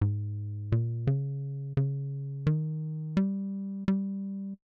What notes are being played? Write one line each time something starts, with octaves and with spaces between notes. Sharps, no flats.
G#2
A#2
C#3
C#3
D#3
G3
G3